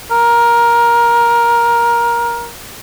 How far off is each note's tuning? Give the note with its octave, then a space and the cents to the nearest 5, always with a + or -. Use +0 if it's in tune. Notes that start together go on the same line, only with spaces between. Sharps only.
A#4 +15